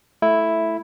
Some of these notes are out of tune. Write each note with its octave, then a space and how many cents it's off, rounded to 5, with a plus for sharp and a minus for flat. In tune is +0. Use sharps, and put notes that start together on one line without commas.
A3 -10 E4 +0